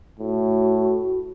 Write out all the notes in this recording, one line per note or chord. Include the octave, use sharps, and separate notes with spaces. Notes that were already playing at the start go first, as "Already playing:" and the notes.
A2 F#4